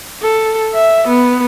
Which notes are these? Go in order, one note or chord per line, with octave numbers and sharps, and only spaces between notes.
A4
E5
B3